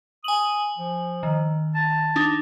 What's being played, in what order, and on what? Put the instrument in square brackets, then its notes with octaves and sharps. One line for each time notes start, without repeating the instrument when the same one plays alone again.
[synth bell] G#5 F#7 [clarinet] D#6
[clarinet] F3
[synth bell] D#3
[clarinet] A5
[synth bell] D4 D#4